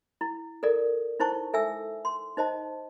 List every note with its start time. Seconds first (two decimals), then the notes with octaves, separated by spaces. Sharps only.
0.21 E4
0.63 A4 A#4 D5
1.20 D#4 E4 C5 A5 C#6
1.54 A4 E5 G#5 E6
2.05 C6
2.37 D#4 C5 D#5 A5